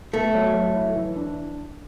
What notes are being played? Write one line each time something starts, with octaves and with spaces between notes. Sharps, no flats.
A3 B3
F#3
F#3
E4
E3
D4